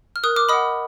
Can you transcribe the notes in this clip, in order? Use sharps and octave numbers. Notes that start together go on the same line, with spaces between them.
F6
A#4 D#6 F#6
D6 F6
D#5 F#5 B5 D#6